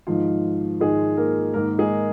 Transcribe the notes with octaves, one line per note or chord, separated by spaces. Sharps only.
G#2 D#3 F3 F4
G#2 D#3 G#3 G#4
A#3 A#4
G#2 D#3 A#3 A#4
G#3 G#4